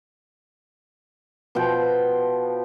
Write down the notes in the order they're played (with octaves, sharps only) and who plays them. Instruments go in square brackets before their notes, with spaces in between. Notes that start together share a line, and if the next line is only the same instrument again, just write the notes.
[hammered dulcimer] B2 F3 F#5 G5